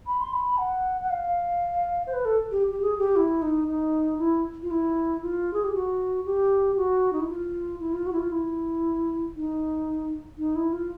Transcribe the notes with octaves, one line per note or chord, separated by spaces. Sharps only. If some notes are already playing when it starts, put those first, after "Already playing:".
B5
C6
B5
F#5
F#5
F5
C5
B4
A4
G4
G4
G#4
G4
E4
D#4
D#4
E4
F4
E4
F4
G#4
G4
F#4
G4
F#4
D#4
E4
F4
E4
F4
F#4
E4
F4
E4
D#4
D#4
E4
F4